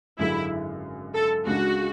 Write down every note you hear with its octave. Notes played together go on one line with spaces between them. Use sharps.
G#1 F#2 D3 G#3 E4
A4
C#2 C#3 G#3 D4 F#4